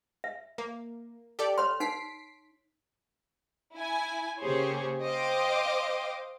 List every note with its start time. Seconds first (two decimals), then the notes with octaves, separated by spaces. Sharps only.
0.24 E5
0.58 A#3
1.39 G4 A4 D5
1.58 C#5 C6 F6
1.80 D#4 B6 C7 D7
3.75 E4 G#5
4.40 C#3 A#3 G4 G#4 C5 C#5
5.03 C5 D#5 F5 G5 D6